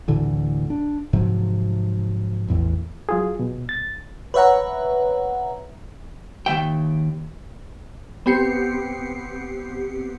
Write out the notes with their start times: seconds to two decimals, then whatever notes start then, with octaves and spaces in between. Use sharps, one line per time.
0.08 D2 A2 D3 E3
0.70 D4
1.13 G#2 C3 F3 F#3
2.48 A1 E2 E3
3.09 F#3 F4 G#4
3.39 B2
3.69 A6
4.34 B4 C#5 E5 F#5 A#5
6.46 D#2 E3 E5 G5
8.26 B3 C4 G4 C7 C#7